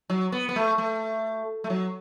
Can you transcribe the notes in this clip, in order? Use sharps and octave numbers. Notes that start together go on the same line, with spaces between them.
F#3
B3
B3
A3
A3
A3
F#3